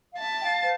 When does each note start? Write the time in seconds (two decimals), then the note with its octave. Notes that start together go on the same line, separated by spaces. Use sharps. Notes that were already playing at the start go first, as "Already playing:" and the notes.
0.11 F5
0.18 E5 A5
0.39 G5
0.44 F5
0.62 C5